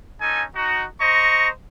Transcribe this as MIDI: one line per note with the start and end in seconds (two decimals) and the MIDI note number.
0.21 0.43 61
0.21 0.43 63
0.21 0.43 69
0.21 0.43 80
0.56 0.84 63
0.56 0.84 66
1.01 1.48 72
1.01 1.48 75
1.01 1.48 82
1.01 1.48 85